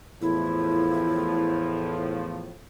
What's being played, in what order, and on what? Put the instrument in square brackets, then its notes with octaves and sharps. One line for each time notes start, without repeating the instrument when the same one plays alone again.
[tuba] E2 [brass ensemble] A2 F3 [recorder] E4